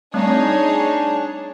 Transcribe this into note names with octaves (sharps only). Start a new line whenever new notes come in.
G3 A3 C4 D4 D#4 G#4 C#5